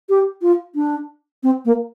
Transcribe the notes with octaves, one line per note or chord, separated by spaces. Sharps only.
G4
F4
D4
C4
A#3